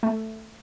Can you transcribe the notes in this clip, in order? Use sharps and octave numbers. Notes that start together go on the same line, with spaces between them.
A3